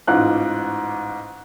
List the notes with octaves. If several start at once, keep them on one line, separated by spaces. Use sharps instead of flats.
A1 G#2 F4 F#6